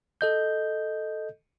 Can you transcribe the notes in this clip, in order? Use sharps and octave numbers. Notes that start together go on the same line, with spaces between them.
A4 D#5 G6